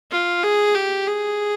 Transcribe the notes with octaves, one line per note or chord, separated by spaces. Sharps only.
F4
G#4
G4
G#4